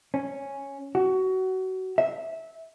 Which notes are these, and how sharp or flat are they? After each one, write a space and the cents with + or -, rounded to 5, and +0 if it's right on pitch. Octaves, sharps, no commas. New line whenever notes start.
C#4 -5
F#4 +25
E5 -15